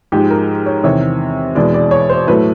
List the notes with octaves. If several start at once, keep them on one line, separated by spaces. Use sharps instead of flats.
G#2 F3 G#3 G4
A#4
C#5
E2 C3 D#3 C#5
E2 B2 G#3 D5
D5
C#5
C5
A2 F#3 A3 B4